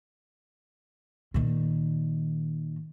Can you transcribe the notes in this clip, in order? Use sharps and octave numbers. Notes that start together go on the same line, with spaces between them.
A#2 D#3